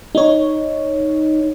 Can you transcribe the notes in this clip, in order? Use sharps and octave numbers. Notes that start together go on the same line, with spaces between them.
D#4 C#5